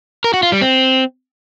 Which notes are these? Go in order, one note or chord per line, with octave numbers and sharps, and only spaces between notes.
A#4
F#4
F4
G3
C4